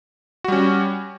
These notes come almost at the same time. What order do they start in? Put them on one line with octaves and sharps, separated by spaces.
F#4 G3 C#4